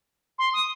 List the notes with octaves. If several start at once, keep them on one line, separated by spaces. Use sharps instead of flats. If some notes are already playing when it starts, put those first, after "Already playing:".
C6
D#6